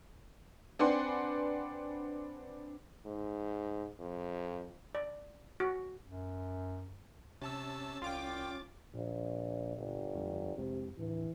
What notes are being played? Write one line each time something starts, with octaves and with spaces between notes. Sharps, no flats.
C4 D4 B4 F#5 G#5 C6
G#2
F2
D5
F#4
F#2
C3 C#4 A5 E6 A6
C2 F4 G5 D6
A#1 A#2
G1
F2 F3 G#3
F2 C3 G#3
D#2 A2 E3